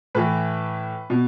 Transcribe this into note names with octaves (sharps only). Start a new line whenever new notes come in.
A2 E3 B4
B2